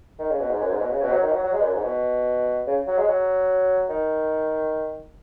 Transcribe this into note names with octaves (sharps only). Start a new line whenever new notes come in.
D#3
C#3
B2
G#2
F#2
G#2
B2
C#3
B2
F#3
D#3
F#3
F#3
G#3
F#2
G#2
B2
C#3
F#3
G#3
F#3
D#3